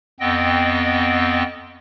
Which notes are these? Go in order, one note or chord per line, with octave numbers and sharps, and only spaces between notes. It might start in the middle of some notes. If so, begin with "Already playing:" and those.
F2 B3 C4 D#5 G5